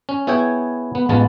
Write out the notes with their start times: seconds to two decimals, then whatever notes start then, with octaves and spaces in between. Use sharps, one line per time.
0.09 C#4
0.27 B3 E4 G#4 C#5 G5 G#5
0.95 B3
1.09 A1 G#3 B3 F4 A5